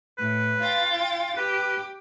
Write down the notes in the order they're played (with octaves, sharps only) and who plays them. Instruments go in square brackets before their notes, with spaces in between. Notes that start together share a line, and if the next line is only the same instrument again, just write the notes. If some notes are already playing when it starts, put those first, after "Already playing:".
[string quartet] A2 [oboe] B4
[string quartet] F4 G5 A6
[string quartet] G4 [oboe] B4